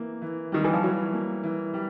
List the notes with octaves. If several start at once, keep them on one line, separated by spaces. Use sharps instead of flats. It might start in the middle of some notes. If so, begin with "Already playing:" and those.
Already playing: E3 A#3
E3
D#3 G3
E3
F3
E3 F#3
A#3
E3
G3